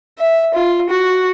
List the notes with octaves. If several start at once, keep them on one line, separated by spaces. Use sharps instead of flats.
E5
F4
F#4